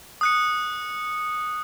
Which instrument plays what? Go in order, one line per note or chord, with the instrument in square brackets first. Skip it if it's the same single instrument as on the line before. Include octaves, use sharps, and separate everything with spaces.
[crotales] D#6 F#6 C#7